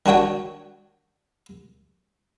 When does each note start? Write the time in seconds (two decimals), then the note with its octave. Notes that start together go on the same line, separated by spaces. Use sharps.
0.06 D#3 D4 F#4 C#5 G5